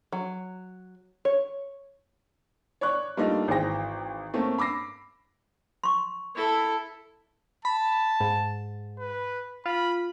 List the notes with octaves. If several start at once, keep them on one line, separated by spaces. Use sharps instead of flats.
F#3
C#5
C#5 D5 C#6 F#6
G3 A3 A#3 D4 D#4 F4
G#1 E3 G#4 C5 G5 A#6
A3 A#3 C4 C#4
B5 D6 E6 A#6 C7
C6 C#6
E4 A4
A5 B5
G#2
B4
F4 B5